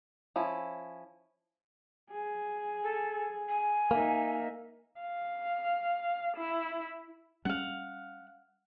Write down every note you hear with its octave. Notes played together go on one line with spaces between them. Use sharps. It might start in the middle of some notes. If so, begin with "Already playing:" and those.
F3 C#4 E4
G#4
A4
G#5
A#3 D#4 E5
F5
E4
G3 C#4 F5 F#5